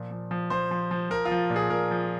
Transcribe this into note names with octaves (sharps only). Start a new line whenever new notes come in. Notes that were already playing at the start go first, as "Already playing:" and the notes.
Already playing: A#2 F3
F3
F3
F3 C5
F3
F3
F3 A#4
F4
F3
A#2
G#4
A#2 A#4
F3